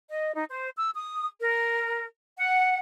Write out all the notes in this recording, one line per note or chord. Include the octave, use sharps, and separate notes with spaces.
D#5
D#4
C5
E6
D#6
A#4
F#5